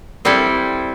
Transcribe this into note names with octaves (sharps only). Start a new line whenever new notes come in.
G3 C4 E4 A4